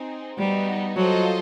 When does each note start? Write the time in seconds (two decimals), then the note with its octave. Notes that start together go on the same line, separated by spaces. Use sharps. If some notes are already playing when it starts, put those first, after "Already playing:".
Already playing: C4 D#4 G#4 C5
0.38 G3 B3 D#4 F#4
0.96 F#3 F4 A4 C5 D#5